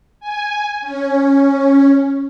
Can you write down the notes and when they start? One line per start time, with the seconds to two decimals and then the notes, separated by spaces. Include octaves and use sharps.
0.20 G#5
0.81 C#4